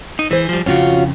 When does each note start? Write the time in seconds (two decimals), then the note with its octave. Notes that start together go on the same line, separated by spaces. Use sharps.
0.19 D#4
0.31 E3 G#4 C5
0.49 F3 G3
0.66 F2 C#3 C#4 F4 F#4